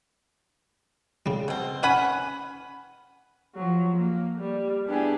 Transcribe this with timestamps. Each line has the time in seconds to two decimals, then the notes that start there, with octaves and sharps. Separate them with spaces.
1.26 C#3 G3
1.48 B2 C4
1.83 C#4 B4 F#5 G#5 B5
3.55 F3 F#3
3.96 A#3
4.39 G3
4.87 B3 D4 E4 G4 G#4